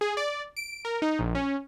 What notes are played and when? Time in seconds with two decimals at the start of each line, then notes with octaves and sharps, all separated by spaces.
0.01 G#4
0.17 D5
0.57 D7
0.85 A#4
1.02 D#4
1.19 A#1
1.35 C#4